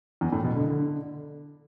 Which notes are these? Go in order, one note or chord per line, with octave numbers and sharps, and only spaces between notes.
E2
A2
B2
D3
D3